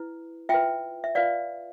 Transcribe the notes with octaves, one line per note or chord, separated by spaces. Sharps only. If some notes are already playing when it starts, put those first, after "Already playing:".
Already playing: E4 B4
F4 B4 E5 G5
E5
F4 B4 D5 F5